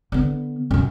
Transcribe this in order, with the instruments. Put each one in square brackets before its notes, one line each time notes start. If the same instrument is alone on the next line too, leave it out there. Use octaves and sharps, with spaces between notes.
[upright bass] D3 B3
F#2 B2